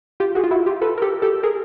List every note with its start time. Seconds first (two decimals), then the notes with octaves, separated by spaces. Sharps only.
0.20 F4 G4
0.35 F#4 G#4
0.44 F4
0.51 E4 F#4
0.66 F4 G4
0.82 A4 B4
0.98 A#4
1.02 G4 A4
1.22 G4 A4
1.43 G#4 A#4